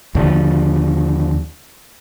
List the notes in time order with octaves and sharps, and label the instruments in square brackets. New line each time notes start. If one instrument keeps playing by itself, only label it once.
[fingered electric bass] D#2 D3 F3